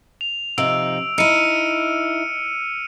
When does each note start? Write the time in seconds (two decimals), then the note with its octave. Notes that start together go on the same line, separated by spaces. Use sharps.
0.21 F7
0.58 C3 F3 D#4 E6 D7
1.18 D#4 E4 F6 C#7 D#7